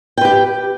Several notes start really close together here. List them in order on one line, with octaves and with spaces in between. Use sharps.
G5 B4 G4